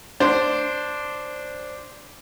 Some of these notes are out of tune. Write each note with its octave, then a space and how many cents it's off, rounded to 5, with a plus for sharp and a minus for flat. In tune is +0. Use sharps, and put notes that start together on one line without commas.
D4 +0 C5 +0